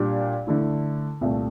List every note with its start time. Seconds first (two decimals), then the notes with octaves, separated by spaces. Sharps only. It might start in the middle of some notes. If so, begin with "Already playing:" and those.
Already playing: A#2 G3 D4 G4
0.47 D3 A3 E4
1.21 C2 A#2 A3